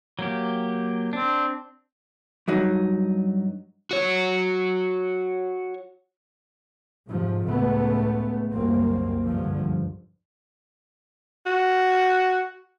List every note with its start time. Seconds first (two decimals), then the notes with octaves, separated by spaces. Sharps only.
0.19 F#3 A#3 G4
1.13 C4 D4
2.48 G2 F#3 D#4
3.91 F#4 C#5
7.09 G#2 C3 F3
7.48 C#2 A2 A3 B3
8.53 F#1 C2 F#2 A#3 C4
9.26 C#2 G2 D3 F3
11.46 F#4